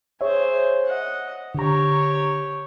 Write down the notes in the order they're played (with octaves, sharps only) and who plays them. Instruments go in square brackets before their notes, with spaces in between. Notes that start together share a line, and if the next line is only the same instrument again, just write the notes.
[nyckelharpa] G#4 C5 [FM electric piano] C#5 E5
[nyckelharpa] D#5 F#5
[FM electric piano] D3 A#5 [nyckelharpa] G4 C#5